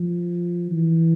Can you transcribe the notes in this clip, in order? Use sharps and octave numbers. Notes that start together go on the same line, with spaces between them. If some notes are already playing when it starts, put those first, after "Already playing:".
Already playing: F3
E3